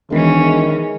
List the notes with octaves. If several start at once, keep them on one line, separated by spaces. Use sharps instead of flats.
E1 D#3 E3 G#3 C#4 A#4 B5